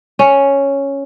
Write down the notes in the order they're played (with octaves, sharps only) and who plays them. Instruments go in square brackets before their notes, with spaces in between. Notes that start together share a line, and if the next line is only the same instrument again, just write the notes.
[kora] C#4